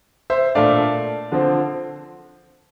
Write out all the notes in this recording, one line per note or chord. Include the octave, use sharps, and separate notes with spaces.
C5 E5
A#2 A3 D4 D5 F5
D3 F3 C4